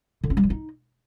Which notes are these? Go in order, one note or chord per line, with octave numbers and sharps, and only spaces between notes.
D3
C#4
G3
F3
D#4